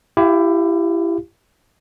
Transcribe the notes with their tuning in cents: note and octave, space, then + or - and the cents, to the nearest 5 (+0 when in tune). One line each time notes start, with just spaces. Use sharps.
E4 +25 G4 +0 F5 -5